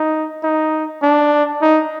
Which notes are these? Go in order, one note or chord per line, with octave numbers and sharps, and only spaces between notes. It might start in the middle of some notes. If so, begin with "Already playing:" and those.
Already playing: D#4
D#4
D4
D#4